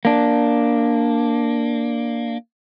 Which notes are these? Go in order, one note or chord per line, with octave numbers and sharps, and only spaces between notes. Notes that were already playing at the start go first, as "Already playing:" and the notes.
A#3 D4